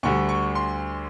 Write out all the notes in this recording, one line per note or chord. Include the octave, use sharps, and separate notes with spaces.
D2 D3 G3 C#6
C#6
C6